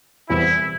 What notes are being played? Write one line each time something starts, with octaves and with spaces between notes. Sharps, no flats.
E1 E2 E3 G3 C4 E4